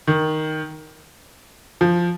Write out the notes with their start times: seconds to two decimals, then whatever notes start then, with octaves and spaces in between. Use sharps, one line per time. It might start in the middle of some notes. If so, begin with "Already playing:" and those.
0.07 D#3
1.81 F3